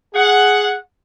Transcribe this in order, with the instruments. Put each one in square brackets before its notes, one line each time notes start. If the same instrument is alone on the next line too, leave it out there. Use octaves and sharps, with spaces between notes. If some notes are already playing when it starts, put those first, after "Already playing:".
[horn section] G#4 F#5